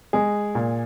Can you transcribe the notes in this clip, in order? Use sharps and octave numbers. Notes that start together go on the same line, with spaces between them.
G#3 G#4
A#2